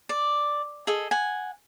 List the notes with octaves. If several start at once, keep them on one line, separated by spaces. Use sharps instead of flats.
D5
G#4 A4 D#5
F#5 G#5